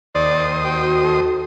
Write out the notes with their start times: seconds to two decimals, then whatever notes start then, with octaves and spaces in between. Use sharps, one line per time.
0.15 D#2 C5 D5 D#6
0.64 F#4 G5
1.03 A4